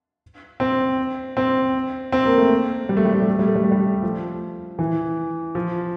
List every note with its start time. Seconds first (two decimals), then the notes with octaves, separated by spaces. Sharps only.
0.60 C4
1.37 C4
2.12 C4
2.26 A#3
2.37 A3
2.89 G3
2.97 A3
3.05 G3
3.13 A3
3.22 G3
3.30 A3
3.39 G3
3.48 A3
3.56 G3
3.64 A3
3.72 G3
4.02 F3
4.79 E3
5.55 F3